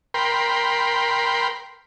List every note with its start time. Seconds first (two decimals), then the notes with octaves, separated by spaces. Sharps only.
0.14 A#4 G5 B5 C6